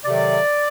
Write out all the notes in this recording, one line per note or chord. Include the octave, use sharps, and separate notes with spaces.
C3 D#3 F#3 A3 D5